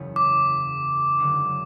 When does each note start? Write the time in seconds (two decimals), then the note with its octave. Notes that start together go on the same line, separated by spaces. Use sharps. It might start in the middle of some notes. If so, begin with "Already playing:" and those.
Already playing: F#1 E2 C#3
0.16 D6
1.18 F#2 D3 G#3